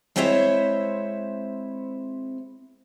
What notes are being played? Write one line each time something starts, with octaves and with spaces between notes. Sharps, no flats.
G#3 C4 E4 C5 C#5 E5